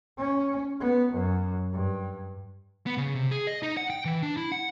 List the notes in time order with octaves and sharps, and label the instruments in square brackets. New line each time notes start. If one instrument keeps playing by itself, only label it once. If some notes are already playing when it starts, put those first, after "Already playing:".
[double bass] C#4
B3
F#2
G2
[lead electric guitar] B3
C#3
C3
G#4
D#5
D#4
F#5
G5
E3
D4
E4
F#5